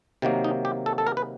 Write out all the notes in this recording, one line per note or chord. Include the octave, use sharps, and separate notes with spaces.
C3 D#3 F#3 A#3
D#4
G4
A4
A4
A#4
B4